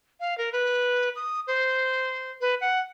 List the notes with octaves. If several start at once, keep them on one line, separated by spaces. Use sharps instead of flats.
F5
A#4
B4
D#6
C5
B4
F#5